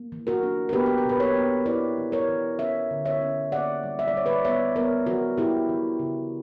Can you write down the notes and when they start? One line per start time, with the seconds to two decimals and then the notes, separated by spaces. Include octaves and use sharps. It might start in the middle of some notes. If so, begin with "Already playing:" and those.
Already playing: A#3
0.12 E3
0.27 F#4 A#4
0.43 D4
0.69 A#4
0.73 B3 G4 B4
0.86 G4
0.98 A#4
1.05 B2 B4
1.20 A#4 C#5
1.36 B3
1.66 E4 B4 D5
1.98 E3
2.12 A#4 C#5
2.29 E3
2.59 C#4 C#5 E5
2.91 D3
3.05 C#5 E5
3.21 C#4
3.52 A#3 D5 F#5
3.83 G3
3.99 E5
4.08 D5
4.14 G3 C#5
4.26 B4 D5
4.45 B3 C#5 E5
4.76 B3 A#4 C#5
5.06 E3 F#4 A#4
5.37 E3 E4 G4
5.69 E3
5.99 C#3